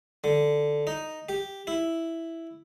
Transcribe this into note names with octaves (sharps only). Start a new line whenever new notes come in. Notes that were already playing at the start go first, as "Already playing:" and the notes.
D3
D#4
G4
E4